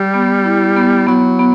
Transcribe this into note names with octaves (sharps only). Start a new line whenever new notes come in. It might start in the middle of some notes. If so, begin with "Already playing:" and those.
Already playing: G3 G4
B3
E4
B3
F#3 B3
B3